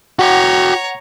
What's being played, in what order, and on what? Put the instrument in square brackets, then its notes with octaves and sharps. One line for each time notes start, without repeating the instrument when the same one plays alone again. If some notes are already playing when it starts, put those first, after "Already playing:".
[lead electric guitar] F#4 G5 [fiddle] C#5 A#5 [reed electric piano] F#5